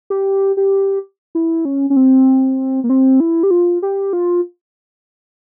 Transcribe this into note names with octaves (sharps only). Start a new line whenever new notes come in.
G4
G4
E4
C#4
C#4
C4
A#3
C4
E4
G4
F4
G4
F4